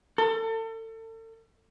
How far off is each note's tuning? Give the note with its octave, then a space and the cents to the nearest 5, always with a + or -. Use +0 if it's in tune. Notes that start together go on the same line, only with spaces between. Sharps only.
A4 +35